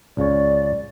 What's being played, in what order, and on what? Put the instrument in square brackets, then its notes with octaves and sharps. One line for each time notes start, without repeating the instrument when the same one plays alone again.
[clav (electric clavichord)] C#2 C#3 C#5 [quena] D5